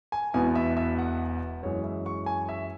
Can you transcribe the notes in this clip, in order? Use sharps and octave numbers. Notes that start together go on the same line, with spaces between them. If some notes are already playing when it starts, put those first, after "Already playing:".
G#5
E1 E2 B2 B3 E4 G#5
E5
E5
F#5
F#2 E3 G#3 C#5
E5
C#6
G#5
E5